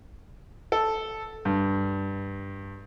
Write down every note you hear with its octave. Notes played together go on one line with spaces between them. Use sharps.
A4
G2